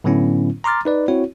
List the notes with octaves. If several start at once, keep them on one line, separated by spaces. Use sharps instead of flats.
A2 D3 F#3 B3 C#4 E4
A#5 C6 D6 F6 A6
D#4 B4 D5
C4 E4 F#4 C#5